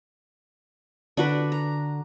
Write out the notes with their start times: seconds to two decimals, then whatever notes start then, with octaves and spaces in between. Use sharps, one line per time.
1.17 D3 D4 F#4 B4
1.52 A#5